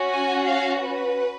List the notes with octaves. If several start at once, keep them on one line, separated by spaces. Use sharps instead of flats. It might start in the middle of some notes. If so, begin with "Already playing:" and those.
Already playing: C#4 F#4
G#5
F5
B4